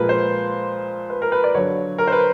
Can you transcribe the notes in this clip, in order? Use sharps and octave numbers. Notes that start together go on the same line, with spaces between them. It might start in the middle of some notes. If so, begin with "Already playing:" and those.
Already playing: A#2 F3 G#3 A#4 B4
C5
B4
A#4
B4
D5
D3 F#3 C#5
A#4
C5
B4